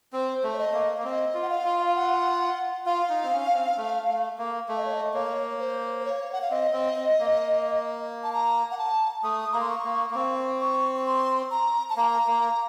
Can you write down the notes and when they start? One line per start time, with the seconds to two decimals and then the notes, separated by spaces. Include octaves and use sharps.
0.13 C4 C5
0.44 A3
0.53 C#5
0.58 D#5
0.73 A#3
0.98 A#3
1.04 C4 D#5
1.34 F4
1.42 F#5
1.50 F5
1.65 F4
1.88 F5
1.96 F#5
2.86 F4 F5
3.10 D#4
3.23 C4
3.32 C#4
3.55 C4
3.77 A3
4.08 A3
4.38 A#3
4.68 A3 F5
4.78 D#5
4.85 C#5
4.94 D#5
5.14 A#3 C#5
5.59 C5
6.00 C5
6.05 C#5
6.32 F#5
6.42 F5
6.51 C4 D#5
6.73 C4
6.96 C4
7.19 A#3
8.23 A5
8.33 A#5
8.71 F#5
8.78 A5
9.23 A3 D#6
9.53 A#3 A#5
9.61 C6
9.69 C#6
9.85 A#3
10.11 A#3
10.14 C4 C#6
10.60 C#6
10.96 C#6
11.06 C6
11.51 A#5
11.90 A5
11.97 A#3 A#5
12.27 A#3